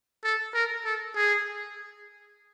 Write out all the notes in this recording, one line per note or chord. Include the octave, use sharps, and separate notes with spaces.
A4
A#4
A4
G#4